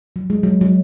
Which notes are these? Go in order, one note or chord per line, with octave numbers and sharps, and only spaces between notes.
F#3
G#3
F#3
F#3